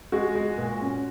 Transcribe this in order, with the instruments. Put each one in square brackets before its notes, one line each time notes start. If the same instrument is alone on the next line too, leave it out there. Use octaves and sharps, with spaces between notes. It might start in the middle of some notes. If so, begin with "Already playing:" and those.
[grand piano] G#3 [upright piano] F#4
[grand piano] G#3
A#2
C#4